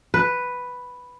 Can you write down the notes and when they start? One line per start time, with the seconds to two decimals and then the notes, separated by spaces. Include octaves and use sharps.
0.14 B4